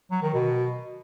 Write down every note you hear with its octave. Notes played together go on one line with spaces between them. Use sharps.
F#3
D#3
B2